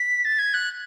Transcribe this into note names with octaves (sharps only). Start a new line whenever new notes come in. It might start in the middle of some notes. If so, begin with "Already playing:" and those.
Already playing: B6
A6
G#6
F#6